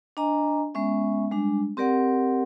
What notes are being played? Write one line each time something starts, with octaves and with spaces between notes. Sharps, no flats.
D4 D#5 G#5 A#5
G#3 B3 C#4 E5
G3 G#3 D4
C4 G4 A#4 D5 F#5